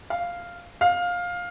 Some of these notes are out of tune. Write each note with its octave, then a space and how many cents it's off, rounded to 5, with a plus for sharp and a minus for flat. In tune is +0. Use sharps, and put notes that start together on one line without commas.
F5 -5
F5 +15